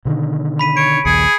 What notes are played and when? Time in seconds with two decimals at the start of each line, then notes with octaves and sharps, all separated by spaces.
0.05 B2 D3 D#3
0.59 B5 B6 D#7
0.77 C#5 D7
1.05 A#1 D#2 G#4 G#6 C#7